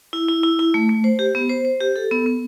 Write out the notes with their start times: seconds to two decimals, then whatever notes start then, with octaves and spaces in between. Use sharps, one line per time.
0.13 E4
0.29 E4
0.43 E4
0.59 E4
0.74 A3
0.89 A3
1.04 C5
1.19 G4
1.35 B3
1.50 C5
1.65 C5
1.80 G4
1.96 A4
2.11 B3
2.26 B3